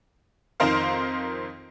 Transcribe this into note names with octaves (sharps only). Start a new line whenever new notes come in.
F2 D#3 D#4 A#4 C5 F5